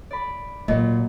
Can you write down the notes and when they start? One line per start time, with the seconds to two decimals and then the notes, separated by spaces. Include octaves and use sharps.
0.11 D5 B5
0.68 A#2 F#3 A#3 D#5